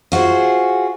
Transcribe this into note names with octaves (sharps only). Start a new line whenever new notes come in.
F4 F#4 G#4 C5